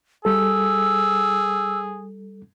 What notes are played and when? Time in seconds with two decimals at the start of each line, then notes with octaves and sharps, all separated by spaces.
0.25 G3 G#4 A4 E6